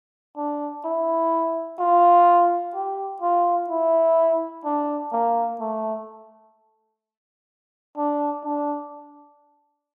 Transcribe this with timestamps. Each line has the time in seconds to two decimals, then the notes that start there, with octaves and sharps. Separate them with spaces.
0.37 D4
0.85 E4
1.80 F4
2.75 G4
3.22 F4
3.70 E4
4.65 D4
5.12 A#3
5.60 A3
7.97 D4
8.45 D4